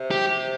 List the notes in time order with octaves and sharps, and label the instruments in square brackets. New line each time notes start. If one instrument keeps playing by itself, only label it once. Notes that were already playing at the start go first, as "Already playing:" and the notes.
Already playing: [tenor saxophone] C3
[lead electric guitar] G4